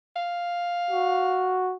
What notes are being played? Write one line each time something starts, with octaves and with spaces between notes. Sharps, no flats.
F5
F#4